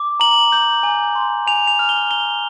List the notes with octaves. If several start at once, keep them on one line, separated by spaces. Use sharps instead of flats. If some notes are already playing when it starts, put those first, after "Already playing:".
Already playing: D6
A#5 F#7
G6
G#5
C6
G#5 F7
F7
F6
G7
A#5 G7